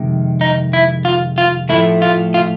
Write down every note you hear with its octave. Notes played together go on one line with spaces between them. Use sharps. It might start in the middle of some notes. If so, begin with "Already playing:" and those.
Already playing: F2 C3 D#3 G#3
D#4
E4
F4
F4
A2 F3 A3 E4
F4
F4